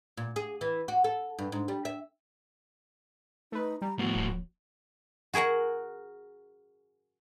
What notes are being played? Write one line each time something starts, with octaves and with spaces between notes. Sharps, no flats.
A#2
G#4
E3
F#4
A4
G2
G#2
G3
E5
A3 D#4 B4
G3 A#5
A2 F3 B3 F#4
D1
F#4 G#4 A#4 F#5 A#5